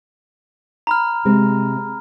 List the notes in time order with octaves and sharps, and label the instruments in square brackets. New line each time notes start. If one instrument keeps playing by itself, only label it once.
[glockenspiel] A#5 B5 F6
[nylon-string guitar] C3 G#3 C4